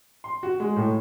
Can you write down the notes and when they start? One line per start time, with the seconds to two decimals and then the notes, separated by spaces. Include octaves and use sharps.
0.24 C6
0.43 F#4
0.60 G#3
0.76 A2